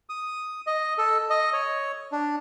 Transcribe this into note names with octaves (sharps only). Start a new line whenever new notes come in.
D#6
D#5
A4
D#5
C#5
D4